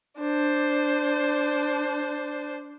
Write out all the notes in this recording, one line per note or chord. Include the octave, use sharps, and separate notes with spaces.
D4 C5